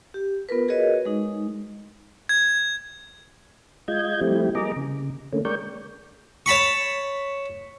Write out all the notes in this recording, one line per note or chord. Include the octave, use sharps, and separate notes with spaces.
G4
B3 F4 A#4 B4
F#4 G#4 A#4 B4 C#5 D#5
G#3 D#4
G#6
G#3 F4 D#5 G6 G#6
F3 G3 A3 C4 E4 G4
G3 A#3 G#4 D#5 A#5 D6
C#3
D3 A3 A#3 C#4
G#3 A#4 D5 G5 C#6 G6
C#5 A5 B5 C#6